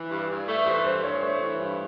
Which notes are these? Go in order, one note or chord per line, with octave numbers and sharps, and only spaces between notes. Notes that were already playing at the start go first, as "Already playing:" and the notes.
Already playing: E3
G2
G2
A3
E3 C5
G2 C5
G2 C#5
A3 C#5
E3
G2